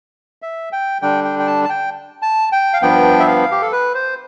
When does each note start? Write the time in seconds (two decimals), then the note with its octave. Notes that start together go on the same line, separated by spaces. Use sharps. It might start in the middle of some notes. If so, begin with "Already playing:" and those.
0.42 E5
0.72 G5
1.02 D3 G3 D4 G5
1.24 G5
1.39 G5
1.47 A5
1.65 A5
1.69 G5
2.22 A5
2.52 G5
2.74 F5
2.82 G2 F3 B3 G5
3.20 E5
3.27 F5
3.51 G4
3.62 A4
3.72 B4
3.94 C5